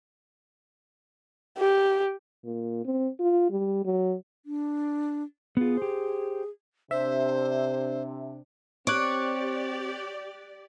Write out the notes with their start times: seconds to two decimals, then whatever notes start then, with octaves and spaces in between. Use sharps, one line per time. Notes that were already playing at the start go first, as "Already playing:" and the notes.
1.58 G4
2.44 A#2
2.85 C4
3.20 F4
3.50 G3
3.85 F#3
4.46 D4
5.57 B3 F4 G#4
5.77 G4 C5
6.91 C3 D4 C5 E5
8.87 C4 G4 C#5 D5 D6 F#6